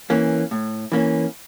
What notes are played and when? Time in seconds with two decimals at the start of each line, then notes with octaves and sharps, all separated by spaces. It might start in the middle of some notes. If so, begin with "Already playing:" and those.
0.10 E3 A#3 C#4
0.51 A2
0.92 E3 A#3 C#4